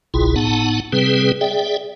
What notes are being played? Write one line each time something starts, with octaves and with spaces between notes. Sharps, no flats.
G1 C2 B2 E4 F4 G#4
A2 B3 D#4 F#5 A5
C3 G3 C4 G#4 B4
G#4 D5 E5 G5